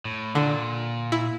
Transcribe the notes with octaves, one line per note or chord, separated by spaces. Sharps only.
A2
A#2 D3
E4